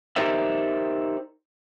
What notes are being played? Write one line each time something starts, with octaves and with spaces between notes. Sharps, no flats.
D#4 G4 A#4 C5 D5 E5